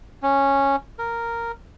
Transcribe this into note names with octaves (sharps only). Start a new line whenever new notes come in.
C#4
A#4